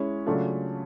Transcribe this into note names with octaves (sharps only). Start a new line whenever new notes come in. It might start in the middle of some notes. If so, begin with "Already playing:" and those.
Already playing: G#3 C#4 E4
C#3 F#3 A3 D4 F4